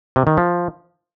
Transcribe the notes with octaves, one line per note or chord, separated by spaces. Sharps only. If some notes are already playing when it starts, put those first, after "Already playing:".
C3
D#3
F3